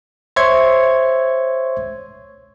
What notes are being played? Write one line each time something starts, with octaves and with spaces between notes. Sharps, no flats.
C5 C#5 E5 C6 C#6 G#6